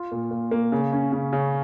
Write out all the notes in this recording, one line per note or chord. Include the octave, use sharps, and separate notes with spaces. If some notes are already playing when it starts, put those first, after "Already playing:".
Already playing: F4
A#2
A#2
A#3
C#3
C#4
C#3
C#3